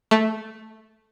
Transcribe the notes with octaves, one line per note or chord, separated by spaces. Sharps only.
A3